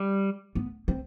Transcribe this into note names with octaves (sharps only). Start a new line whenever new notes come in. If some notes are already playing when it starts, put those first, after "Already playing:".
Already playing: G3
B3
C4